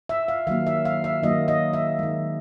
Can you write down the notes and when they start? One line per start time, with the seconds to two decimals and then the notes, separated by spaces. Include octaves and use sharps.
0.09 E5
0.28 F5
0.47 D#3 F#3 A#3 F5
0.67 E5
0.85 F5
1.04 E5
1.23 D#3 F#3 A#3 D#5
1.48 D#5
1.73 E5
1.99 D#3 G#3